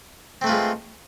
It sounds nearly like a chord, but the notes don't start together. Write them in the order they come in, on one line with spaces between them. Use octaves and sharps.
C4 A3 B4 F4 G#3